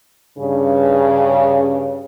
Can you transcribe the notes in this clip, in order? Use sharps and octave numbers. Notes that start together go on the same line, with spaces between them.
G2 C#3